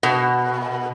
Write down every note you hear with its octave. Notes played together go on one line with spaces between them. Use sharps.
B2